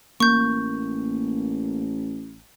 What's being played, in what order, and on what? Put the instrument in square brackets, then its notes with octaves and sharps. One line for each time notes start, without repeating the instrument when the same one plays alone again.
[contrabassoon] A1 [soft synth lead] A#3 [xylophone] C#6 G6